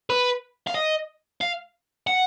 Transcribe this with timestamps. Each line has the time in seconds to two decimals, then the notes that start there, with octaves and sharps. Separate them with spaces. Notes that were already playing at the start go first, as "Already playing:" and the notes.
0.10 B4
0.67 F5
0.75 D#5
1.41 F5
2.07 F#5